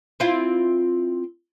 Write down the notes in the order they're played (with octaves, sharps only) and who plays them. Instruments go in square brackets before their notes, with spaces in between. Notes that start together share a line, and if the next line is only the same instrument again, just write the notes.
[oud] C4 E4 F4